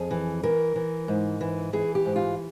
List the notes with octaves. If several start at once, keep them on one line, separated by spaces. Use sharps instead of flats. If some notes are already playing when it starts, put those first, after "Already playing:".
Already playing: F2 G#4
E3
E3 A#4
E3
G#2
E3
E3 G#4
G4
G#2
F4